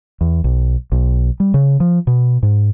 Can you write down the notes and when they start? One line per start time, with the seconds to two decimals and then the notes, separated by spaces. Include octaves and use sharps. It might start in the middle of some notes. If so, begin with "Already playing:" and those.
0.21 E2
0.44 B1
0.92 B1
1.40 G3
1.54 C#3
1.80 F3
2.07 B2
2.43 G#2